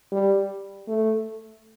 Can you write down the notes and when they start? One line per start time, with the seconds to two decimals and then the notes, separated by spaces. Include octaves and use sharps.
0.12 G3
0.88 A3